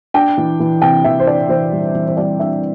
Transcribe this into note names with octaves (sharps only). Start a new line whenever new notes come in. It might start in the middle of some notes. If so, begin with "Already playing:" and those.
D4 G5
E3
E3
C3 G5
E3 E5
C5
D4 D5
E3 C5
G3
E3
C5
G3 D5
D4 E5